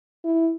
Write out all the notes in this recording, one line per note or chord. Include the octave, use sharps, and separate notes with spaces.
E4